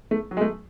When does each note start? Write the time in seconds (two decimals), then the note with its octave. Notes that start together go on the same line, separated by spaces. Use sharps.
0.11 A3
0.31 F#3
0.37 G#3
0.41 A3